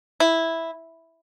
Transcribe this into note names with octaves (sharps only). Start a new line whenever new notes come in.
E4